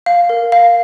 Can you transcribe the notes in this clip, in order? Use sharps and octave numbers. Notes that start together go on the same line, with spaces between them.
F5
A#4
F5